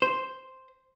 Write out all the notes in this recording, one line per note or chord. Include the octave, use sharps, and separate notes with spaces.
C5